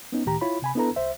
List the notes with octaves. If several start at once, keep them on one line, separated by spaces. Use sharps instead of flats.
B3 C#4 D#4
C#2 A2 D#3 G4 A#5
E4 F4 C#5 B5
C3 G#5 B5
B3 D4 E4 A4 B4 A#5
C2 C5 E5